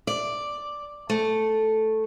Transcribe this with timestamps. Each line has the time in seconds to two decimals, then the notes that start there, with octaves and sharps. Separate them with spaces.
0.07 D5
1.10 A3